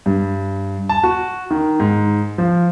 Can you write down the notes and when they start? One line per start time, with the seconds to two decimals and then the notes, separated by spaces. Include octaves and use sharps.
0.06 G2
0.89 A5
1.03 F#4
1.51 D#3
1.80 G#2
2.38 F3